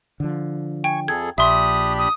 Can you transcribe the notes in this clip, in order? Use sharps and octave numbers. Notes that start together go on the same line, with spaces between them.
D3 F3
G5 G#5 C#6
F2 G#4 A4 G#6
A#1 D4 G4 E5 B5 C6 D#6
D#6